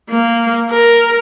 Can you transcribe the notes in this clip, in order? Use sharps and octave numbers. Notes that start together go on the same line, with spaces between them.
A#3
A#4